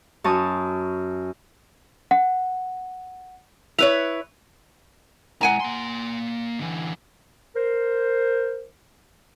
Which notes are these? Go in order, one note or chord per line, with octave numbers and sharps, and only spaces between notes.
F#2 A5 C#6 D#6
F#5
E4 B4 C#5 F7
G#3 E4 F#5 G#5 A#5
A#3 C6
D3 E3
A#4 C5